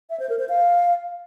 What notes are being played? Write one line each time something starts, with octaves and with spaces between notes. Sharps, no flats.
E5
C5
A#4
C5
F5